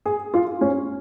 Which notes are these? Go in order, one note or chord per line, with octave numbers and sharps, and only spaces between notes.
G#4
F4
C#4